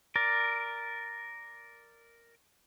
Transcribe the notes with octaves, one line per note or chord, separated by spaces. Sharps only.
A#4 D5